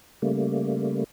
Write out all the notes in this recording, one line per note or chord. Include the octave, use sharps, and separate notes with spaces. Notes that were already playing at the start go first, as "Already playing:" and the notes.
C#3 G3 A3 A#3